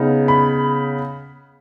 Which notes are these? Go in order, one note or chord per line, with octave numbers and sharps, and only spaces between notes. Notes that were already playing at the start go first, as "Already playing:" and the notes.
Already playing: C#3 B3 D#4
B5